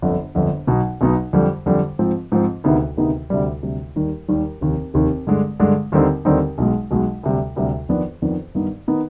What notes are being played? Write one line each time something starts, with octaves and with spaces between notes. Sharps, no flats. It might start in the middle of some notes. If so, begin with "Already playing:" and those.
G1 F2 D3
G1 F2 D3
B1 B2 B3 D#4
B1 B2 B3 D#4
F2 D3 G3
F2 D3 G3
G#2 F3 C4
G#2 F3 C4
D2 C3 D#3 B3 D#4
D2 C3 D#3 B3 D#4
D2 C3 G3
D2 C3 G3
D#2 D#3 G3
D#2 D#3 G3
F1 D#2 D#3
F1 D#2 D#3
G2 D3 G#3 D4
G2 D3 G#3 D4
D#2 D3 G3 C4 D#4
D#2 D3 G3 C4 D#4
B1 B2 G#3
B1 B2 G#3
D2 C3 G3
D2 C3 G3
F2 D#3 B3 D4
F2 D#3 B3 D4
G2 D#3 B3 D#4
D#3 B3 D#4